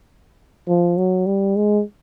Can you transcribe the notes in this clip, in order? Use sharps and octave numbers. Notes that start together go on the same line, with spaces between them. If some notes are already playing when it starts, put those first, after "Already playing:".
F3
F#3
G3
G#3